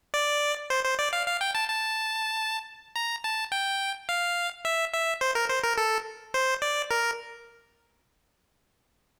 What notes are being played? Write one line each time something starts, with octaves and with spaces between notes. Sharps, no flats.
D5
C5
C5
D5
F5
F5
G5
A5
A5
A#5
A5
G5
F5
E5
E5
C5
A#4
C5
A#4
A4
C5
D5
A#4